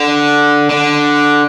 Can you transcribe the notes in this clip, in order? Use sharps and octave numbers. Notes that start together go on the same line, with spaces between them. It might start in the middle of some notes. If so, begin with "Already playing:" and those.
Already playing: D3
D3